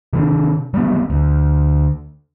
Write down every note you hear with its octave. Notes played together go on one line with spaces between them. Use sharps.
C3 D#3 C4 D4
F#3 G3 A3 B3
D2